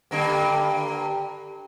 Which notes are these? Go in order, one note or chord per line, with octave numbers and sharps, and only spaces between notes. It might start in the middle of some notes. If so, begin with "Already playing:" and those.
G2 D3 A#3